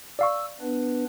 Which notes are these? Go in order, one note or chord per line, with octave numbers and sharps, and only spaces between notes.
D5 F5 C#6 E6
B3 D4 B4